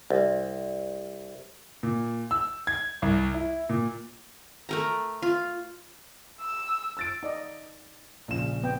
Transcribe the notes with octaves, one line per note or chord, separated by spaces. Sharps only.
C2
A#2
E6
G#6
C2
E4
A#2
A3 A#4 A#5
F4
E6
E6 A6 D7
D#4 D5 D#5
A#1 C#3 E7
B3 G5